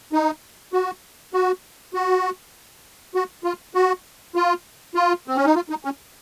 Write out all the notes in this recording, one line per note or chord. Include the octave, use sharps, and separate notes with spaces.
D#4
F#4
F#4
F#4
F#4
F4
F#4
F4
F4
C4
C#4
D#4
F4
D#4
C#4